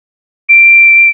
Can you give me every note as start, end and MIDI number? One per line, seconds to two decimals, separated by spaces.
0.49 1.09 98